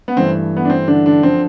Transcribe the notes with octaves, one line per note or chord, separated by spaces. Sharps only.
B3
G2 E3 A3 C4
B3
D4
C4
D3 D4
D3 D4
D3 F3 C4